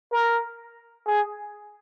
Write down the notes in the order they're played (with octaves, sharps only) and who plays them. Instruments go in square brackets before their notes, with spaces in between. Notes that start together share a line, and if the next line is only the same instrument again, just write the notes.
[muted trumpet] A#4
G#4